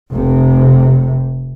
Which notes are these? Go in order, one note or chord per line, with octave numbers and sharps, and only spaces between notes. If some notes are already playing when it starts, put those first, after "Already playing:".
F1 C3